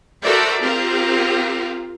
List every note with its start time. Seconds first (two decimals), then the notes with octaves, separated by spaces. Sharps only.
0.23 F#4 A4 A#4 C5 D5 E5
0.61 C4 F4 G4 A#4 F5